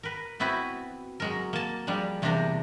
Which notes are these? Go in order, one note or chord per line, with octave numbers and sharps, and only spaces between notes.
A#4 B4
B3 C4 E4 F#4 B4
F#3 G#3 A#4
A#3 A5
F3 G3 G#3 D4
E2 C3 A#3 D4 C5 A#5